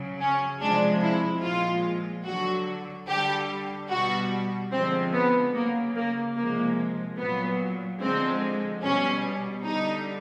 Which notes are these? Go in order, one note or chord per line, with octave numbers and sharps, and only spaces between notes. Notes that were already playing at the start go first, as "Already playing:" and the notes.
Already playing: C#3 F#3
C#4
C3 F3 G#3 D4
E4
A#2 F3 G#3 F4
D3 F#3 F#4
D3 G3 G4
B2 G3 F#4
D3 F3 G#3 C4
B3
C#3 F#3 A#3
A#3
C3 F3 G#3 A#3
A#2 F#3 B3
D3 F3 G#3 C4
B2 G3 C#4
D3 G3 D#4